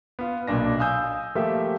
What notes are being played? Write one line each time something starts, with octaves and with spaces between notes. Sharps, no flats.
B3 F4
B1 A#2 D4 A#6
F5 G#5 D#6 E6 G6
F3 A3 A#3 G4 E5